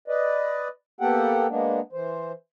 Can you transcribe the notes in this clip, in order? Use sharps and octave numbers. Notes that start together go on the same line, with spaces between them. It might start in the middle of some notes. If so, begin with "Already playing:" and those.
B4 D5 D#5
A#3 B3 G4 A4 F#5 G5
G#3 A#3 B3 D4
E3 C5